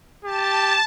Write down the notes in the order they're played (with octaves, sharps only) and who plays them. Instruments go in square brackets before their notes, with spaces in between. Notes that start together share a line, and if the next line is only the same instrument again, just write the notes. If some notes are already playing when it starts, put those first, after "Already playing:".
[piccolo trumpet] G4 [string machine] A5